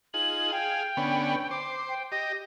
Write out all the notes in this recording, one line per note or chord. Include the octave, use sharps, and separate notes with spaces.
D#4 F4 G#4 F#7
G#4 F5 G5
D3 B3 C#4
C5 D6
G5
G4 D#5 A#6